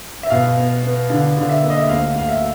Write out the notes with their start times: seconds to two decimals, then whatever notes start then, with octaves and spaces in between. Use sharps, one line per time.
0.23 E5
0.30 B2 F5
0.57 B3
0.83 B3
1.10 D3 F5
1.37 D3 F5
1.49 E5
1.63 A#3
1.70 D#5
1.79 E5
1.89 D2 F5
2.16 D2 F5
2.29 E5